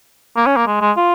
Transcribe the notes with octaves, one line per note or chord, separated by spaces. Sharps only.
A#3
C#4
A#3
G#3
G#3
F4